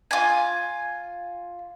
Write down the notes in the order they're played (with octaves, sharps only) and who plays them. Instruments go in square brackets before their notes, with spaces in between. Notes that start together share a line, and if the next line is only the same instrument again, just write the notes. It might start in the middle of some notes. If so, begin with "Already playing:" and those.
[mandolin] F4 G#5